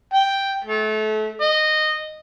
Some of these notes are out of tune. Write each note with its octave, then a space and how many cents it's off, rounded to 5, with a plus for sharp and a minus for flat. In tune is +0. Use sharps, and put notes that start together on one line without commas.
G5 +0
A3 -30
D#5 -15